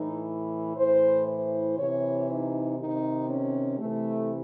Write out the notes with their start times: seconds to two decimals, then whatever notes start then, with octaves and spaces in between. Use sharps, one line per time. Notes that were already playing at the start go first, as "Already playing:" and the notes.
Already playing: A2 E3 D#4
0.76 A2 E3 C5
1.25 C5
1.76 C3 E3 C#5
2.27 D#4
2.77 C3 D#3 D#4
3.27 C#4
3.78 C3 E3 A3